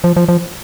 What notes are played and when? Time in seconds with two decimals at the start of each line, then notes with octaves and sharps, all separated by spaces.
0.04 F3
0.16 F3
0.29 F3